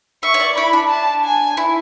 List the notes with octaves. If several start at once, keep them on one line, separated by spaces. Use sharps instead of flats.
E5 C#6
C#5
D5
E4 B5
D4
A5
G#5
E4